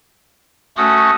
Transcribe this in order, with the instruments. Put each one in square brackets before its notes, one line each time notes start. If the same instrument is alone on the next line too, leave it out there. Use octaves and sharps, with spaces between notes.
[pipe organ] A3 C#4 F#4 [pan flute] D#6